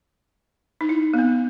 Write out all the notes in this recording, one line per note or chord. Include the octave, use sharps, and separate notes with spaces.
D#4
E4
B3
C4